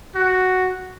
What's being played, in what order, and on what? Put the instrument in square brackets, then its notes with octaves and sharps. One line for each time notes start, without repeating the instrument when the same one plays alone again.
[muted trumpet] F#4